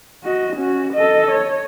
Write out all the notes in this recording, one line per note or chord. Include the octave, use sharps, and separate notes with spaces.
F#4 D#5
C#4 F#4
A4 D#5
C#5